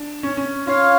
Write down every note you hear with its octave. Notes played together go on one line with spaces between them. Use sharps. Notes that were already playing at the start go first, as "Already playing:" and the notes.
Already playing: D4
C#4
C#4
C#4 F4 C#5 F5